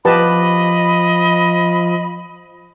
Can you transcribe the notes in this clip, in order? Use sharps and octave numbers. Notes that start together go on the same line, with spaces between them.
F3 G4 B4 D#5 A5 B5